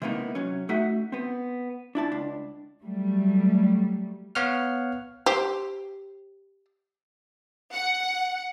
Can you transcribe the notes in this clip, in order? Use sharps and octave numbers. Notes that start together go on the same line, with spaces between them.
C3 G#3 A#3 B3 D#4 E4
C3 F#3 C#4
A3 D#4 F#4 E5 F#5
B3 C4
D4 E4 A5
C#2 D4
F#3 G3 A3
B3 C#5 F5 F#5 F6
G4 C5
F#5